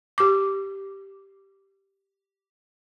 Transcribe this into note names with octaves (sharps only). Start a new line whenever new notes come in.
G4 D6